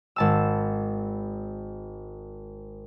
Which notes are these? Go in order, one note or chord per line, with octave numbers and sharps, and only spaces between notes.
G#1 A5 E6